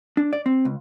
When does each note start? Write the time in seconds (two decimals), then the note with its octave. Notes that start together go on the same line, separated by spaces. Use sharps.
0.17 D4
0.33 D5
0.46 C4
0.65 C#2